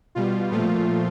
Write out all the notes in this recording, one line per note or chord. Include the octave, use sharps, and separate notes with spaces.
B2 G3 F4
A#2 F3 A3 F4